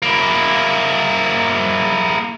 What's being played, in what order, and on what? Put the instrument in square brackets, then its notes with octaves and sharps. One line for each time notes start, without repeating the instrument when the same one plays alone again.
[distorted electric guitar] A#3 E4